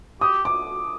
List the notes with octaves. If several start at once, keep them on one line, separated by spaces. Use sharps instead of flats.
G4 D#6
D6